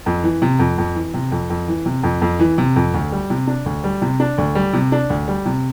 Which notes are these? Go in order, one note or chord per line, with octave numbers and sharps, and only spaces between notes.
F2
E3
C3
F2
F2
E3
C3
F2
F2
E3
C3
F2
F2
E3
C3
F2
D2
G3
C3
D4
D2
G3
C3
D4
D2
G3
C3
D4
D2
G3
C3